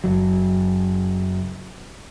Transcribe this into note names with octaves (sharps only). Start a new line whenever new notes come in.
F#1 F#3